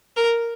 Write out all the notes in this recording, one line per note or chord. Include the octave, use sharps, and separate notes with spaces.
A#4